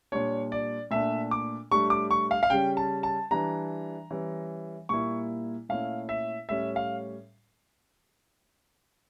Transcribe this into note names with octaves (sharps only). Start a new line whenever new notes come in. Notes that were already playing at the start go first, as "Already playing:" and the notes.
A#2 G3 D4 C#5
D5
A#2 A3 D4 E5
D6
A2 G3 D4 C#6
D6
C#6
F5
F5
C#3 G3 C#4 G5
A5
A5
E3 G3 D4 A#5
E3 G3 C#4
A#2 G3 A#3 E4 C#6
A#2 A3 C#4 E4 F5
E5
A2 G3 C#4 E5
F5